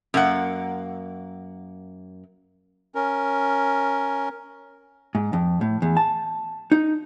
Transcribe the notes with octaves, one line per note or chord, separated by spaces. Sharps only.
F#2 A#3 F#5
C#4 A#4
G#2
F2
A2
E2
A5
D#4